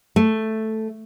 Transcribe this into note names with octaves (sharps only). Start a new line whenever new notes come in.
A3